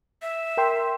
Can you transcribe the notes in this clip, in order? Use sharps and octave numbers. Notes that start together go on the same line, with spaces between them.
E5
A#4 G5 C6